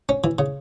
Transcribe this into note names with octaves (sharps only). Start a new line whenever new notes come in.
C#4
E3
C#3